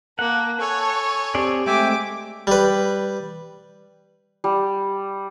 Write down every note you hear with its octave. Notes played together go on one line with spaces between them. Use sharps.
A#3 F#5 A5
A4 C#5 G#5 C#6
C4 G4 G#4 D5
G#3 A3 C4 E5 G5 G#5 D6
G3 B4
G3